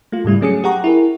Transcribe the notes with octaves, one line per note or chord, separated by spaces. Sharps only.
A3 F4
G#2 C#3 G3 E4
F#3 A3 C#4 G#4 D#6 C#7
G4 G#4 F#5 A#5 C#6
E4 G#4 A#4